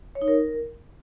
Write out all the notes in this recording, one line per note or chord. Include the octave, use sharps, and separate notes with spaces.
C#5
D#4
A#4